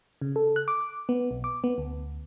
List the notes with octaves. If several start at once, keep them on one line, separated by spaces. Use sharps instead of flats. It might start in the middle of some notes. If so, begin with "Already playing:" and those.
C#3
A4
F#6
D6
B3
B1
D6
B3
D2